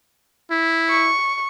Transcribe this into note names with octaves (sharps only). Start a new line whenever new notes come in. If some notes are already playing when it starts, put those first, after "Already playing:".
E4
C#6